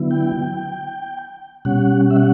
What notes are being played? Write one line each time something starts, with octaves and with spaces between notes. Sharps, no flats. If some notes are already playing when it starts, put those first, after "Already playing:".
Already playing: D3 F#3 B3 E4
G5
B2 G3 C#4 F#5
E5
F#5